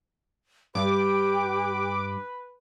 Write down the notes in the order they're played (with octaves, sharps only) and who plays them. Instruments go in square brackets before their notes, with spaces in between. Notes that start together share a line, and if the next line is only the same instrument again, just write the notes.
[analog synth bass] G2 [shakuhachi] G4 [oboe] B4 [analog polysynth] D6